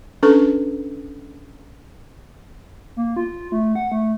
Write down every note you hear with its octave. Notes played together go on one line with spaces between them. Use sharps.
C#4 D4 A4 B4 C#6
A#3
F4
A3
F#5
A3